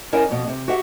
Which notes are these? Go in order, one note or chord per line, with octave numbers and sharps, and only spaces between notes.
C#4 E4 A#4 D#5 F#5 G#5
F2 B2
C3
F#4 G4 E5 F#5